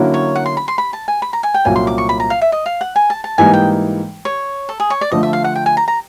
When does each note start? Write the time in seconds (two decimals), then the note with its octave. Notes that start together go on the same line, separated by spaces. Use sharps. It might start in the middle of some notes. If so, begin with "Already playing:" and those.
Already playing: D3 F#3 A#3 C#4 E4
0.14 C#5
0.35 F#5
0.46 C6
0.57 B5
0.68 C6
0.78 B5
0.93 A5
1.08 G#5
1.22 B5
1.33 A#5
1.43 G#5
1.54 G5
1.65 C2 A#2 F#3 A#3 C#4 G#5
1.76 C6
1.87 D6
1.98 C#6
2.09 B5
2.20 A#5
2.30 F5
2.42 E5
2.52 D#5
2.66 F5
2.81 F#5
2.96 G#5
3.10 A5
3.24 A5
3.38 G#2 E3 G3 A#3 D#4 G#5
3.53 G5
4.25 C#5
4.69 A4
4.80 G#4
4.90 C#5
5.01 D5
5.11 D3 F3 A3 D#5
5.23 E5
5.33 F5
5.44 F#5
5.55 G5
5.66 G#5
5.77 A#5
5.88 A#5